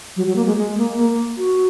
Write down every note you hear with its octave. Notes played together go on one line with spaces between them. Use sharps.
F#3
F#3
A#3
G#3
G#3
A#3
A#3
F#4